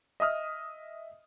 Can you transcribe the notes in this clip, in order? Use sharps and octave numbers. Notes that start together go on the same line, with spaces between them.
D#5 E5 D#6 F6